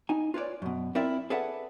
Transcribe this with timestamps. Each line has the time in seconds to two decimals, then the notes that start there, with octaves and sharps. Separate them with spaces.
0.09 D#4 G#5
0.34 F4 B4 C#5 D5
0.62 F#2 B2
0.95 C4 E4 F4 A#4 D5 E5
1.30 G#4 A4 B4 D5 E5 F#5